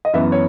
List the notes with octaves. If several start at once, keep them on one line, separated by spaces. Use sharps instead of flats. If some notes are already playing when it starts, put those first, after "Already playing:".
D#5
F#2 E3 B3 E5
C#5